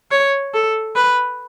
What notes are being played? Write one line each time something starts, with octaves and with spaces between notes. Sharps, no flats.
C#5
A4
B4